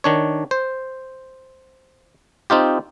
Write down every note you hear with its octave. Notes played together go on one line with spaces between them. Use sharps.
D#3 D4 C#5
C5
C4 D#4 F4 G4